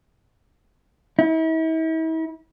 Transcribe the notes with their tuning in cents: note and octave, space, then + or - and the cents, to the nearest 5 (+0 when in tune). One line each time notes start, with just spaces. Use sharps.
E4 -40